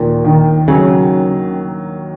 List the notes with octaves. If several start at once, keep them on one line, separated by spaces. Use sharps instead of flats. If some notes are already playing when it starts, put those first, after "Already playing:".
Already playing: D#2 A#2
D#3
C#3 F#3